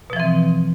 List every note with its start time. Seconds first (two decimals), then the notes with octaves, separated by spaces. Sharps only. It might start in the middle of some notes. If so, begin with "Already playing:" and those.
0.10 B2
0.13 F3
0.16 E3
0.20 C4